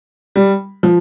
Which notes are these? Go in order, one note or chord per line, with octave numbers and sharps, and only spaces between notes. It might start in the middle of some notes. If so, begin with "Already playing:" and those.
G3
F3